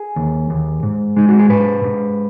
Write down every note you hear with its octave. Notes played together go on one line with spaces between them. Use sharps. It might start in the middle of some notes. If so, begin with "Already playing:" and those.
Already playing: G#4
D#2
D#2
G#2
G#3 D#4
F#4
G#4
G#2 B4
G#2